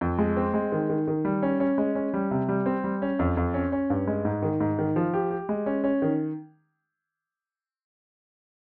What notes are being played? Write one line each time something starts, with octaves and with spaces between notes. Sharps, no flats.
F2
G#3
C4
G#3
D#3
D#3
D#3
G3
C#4
C#4
G#3
C#4
G3
C3
G3
C4
G3
C#4
F2
F2
C#4
C#4
G2
G#3
G#2
D#3
G#2
D#3
F3
G4
G4
G#3
C#4
C#4
D#3